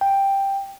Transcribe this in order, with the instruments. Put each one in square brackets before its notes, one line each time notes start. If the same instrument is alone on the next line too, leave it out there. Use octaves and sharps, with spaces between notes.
[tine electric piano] G5